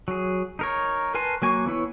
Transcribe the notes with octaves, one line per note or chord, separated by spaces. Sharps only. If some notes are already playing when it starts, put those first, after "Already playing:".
F#3 G#4
D#4 A#4 C#5
A#4 B4 G#5 A5 C6
F#3 A#3 G#5 C#6
E3 B3 E4 C#5